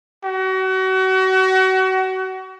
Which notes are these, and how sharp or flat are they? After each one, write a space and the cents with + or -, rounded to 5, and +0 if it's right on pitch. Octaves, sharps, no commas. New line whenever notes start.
F#4 +30